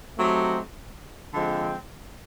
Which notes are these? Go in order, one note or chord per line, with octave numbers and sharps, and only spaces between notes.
F#3 A3 C4 D#4 G4
D3 F3 G#3 C4